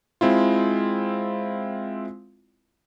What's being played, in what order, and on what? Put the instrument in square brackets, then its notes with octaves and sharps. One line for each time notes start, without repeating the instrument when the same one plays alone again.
[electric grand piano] G#3 C4 E4 F4